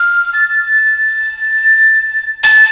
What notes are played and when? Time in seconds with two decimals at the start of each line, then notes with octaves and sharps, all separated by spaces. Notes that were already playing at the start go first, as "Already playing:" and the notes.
Already playing: F6
0.34 A6
2.43 A6